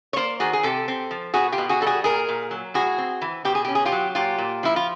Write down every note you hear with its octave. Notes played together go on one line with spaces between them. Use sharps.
C#5
A#3 C5 D5
D#3 F#4 G#4
G#4
C3 G4 A4
C4
F3
B2 F#4 G#4
F4 G4
B2
F#4 G#4
G3 A4
F#4 G#4
A#2 G#4 A#4
A#2
F#3
A2 F#4 G#4
C4
E3
B2 G4
G#4
C#4 G4
G#4
F4 G4
F#3
A#2 F4 G4
A#2
F3 E4
F4